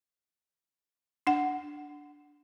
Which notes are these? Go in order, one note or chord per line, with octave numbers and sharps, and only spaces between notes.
D4 F#5